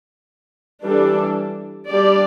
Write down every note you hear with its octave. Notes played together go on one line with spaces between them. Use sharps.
E3 G3 D4 A4
G3 D4 G4 D5